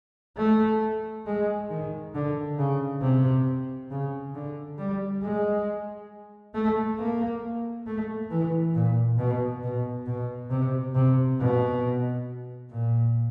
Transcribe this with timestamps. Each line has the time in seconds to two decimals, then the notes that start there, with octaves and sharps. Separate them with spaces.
0.37 A3
1.26 G#3
1.70 D#3
2.14 D3
2.58 C#3
3.01 C3
3.90 C#3
4.34 D3
4.78 G3
5.22 G#3
6.54 A3
6.98 A#3
7.87 A3
8.30 E3
8.74 A#2
9.18 B2
9.63 B2
10.06 B2
10.50 C3
10.95 C3
11.39 B2
12.71 A#2